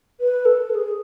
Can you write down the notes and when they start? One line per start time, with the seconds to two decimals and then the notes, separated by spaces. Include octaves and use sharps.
0.20 B4
0.45 A4
0.70 B4
0.74 G#4